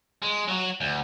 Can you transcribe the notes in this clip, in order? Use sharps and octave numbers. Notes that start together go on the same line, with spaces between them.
G#3
F#3 F#4
D2